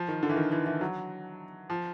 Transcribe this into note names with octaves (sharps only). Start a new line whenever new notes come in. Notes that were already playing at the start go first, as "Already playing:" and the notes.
Already playing: F3
D#3
D3
E3
D#3
E3
E3
F#3
F3